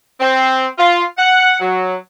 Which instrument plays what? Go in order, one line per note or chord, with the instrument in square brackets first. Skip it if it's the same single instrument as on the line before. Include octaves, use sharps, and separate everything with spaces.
[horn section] C4
F4
F#5
F#3